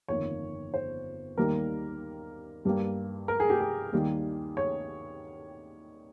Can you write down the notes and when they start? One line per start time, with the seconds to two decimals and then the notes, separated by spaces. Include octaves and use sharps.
0.08 G1 F2 D#3 A#3 C#5
0.74 C5
1.37 D#2 D#3 G3 A#3 A#4
2.65 G2 G3 A#3
3.28 A#4
3.40 G#4
3.50 G4
3.61 G#4
3.92 D#2 D#3 G3 A#3
4.57 C#5